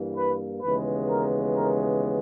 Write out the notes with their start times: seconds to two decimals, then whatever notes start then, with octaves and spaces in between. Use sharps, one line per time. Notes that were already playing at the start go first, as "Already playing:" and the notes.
Already playing: G2 E3 A#3
0.17 B4
0.62 D#2 C#3 E3 G#3 B3 B4
1.10 A#4
1.56 A#4